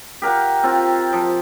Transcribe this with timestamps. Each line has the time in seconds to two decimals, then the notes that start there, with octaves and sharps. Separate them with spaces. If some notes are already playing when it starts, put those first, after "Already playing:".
0.22 G4 A#4 F5 F#5
0.63 C4 F4
1.13 F3